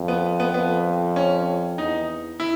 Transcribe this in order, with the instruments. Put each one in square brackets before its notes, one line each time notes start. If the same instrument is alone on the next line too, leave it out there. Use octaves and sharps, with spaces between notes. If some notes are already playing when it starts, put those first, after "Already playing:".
Already playing: [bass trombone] F2
[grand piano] B3
B3
[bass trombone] F2 [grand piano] B3
[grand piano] C#4
[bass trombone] E2 [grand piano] D#4
[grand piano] E4